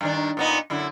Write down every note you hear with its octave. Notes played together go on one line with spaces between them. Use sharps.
G2 D#3 D4
A#2 B3 D#4
F#2 D3 E4